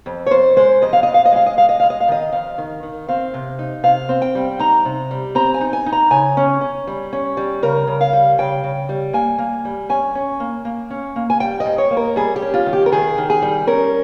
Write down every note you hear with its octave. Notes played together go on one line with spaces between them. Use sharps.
F2
C#5
F2 C5
G#3 C5
F2 D#5
F5
F2 D#5
F5
D#5
G#3 F5
D#5
G#3 F5
D#5
G#3 F5
D#5
F5
D#3 D#5
F2 F5
D#3
D#3
C4 F5
C3
D#4
C3 F5
C4
G5
G3
D#4 A#5
C3
G3
C4 A#5
G#5
D#4
G#5
D#4
A#5
C#3 G#5
C#4
C#4
G3
C#4
G3
C#3 A#4
C#3
F5
G3
C#3 G5
C#3
G3
A#3 G#5
A#3
G3
C#4 G#5
C#4
A#3
A#3
C#4
A#3
G#5
G3 G5
D#5
G#2
C#5
A#3
A#4
G3 G#4
G4
C#4
F4
D#3
G4
A#4
D#3 G#4
D#3
G#4
G3
C#4 A#4